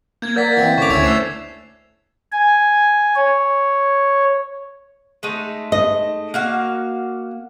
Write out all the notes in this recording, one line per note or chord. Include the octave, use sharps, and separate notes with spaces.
A#3 G6 G#6
A#4 D5 F#5 G6 A6 B6
E3 C4
A2 C#3 C#6 D6 B6 F7
D2 C#4 D4 E4 G#6 F7
A3 C5 E6 C7 E7
G#5
C#5
G#3 A3 D#4
D#5
A#3 F#4 F5